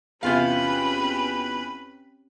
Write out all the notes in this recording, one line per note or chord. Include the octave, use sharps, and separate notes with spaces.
E2 C3 C4 C#4 F4 G4 B4 F5